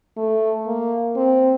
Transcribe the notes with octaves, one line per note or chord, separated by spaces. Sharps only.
A3
A#3
C4